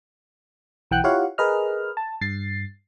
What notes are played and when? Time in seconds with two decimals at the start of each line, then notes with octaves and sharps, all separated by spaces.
0.91 B1 E3 F#5 G5 F#6
1.04 E4 F4 G4 C#5 F5 F#5
1.38 G#4 A#4 B4 D#5 F6
1.97 A5
2.21 G2 A6 C7